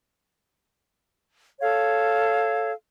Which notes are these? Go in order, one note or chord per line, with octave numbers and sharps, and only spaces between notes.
A4 C#5 F5